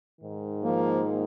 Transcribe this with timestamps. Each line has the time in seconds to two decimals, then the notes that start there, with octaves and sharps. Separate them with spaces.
0.20 G#2 D#3
0.64 F3 A#3